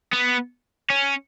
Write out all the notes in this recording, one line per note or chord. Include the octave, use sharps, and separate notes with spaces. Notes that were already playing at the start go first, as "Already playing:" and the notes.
B3
C#4